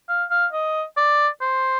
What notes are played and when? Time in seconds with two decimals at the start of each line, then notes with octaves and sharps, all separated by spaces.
0.09 F5
0.31 F5
0.53 D#5
0.97 D5
1.42 C5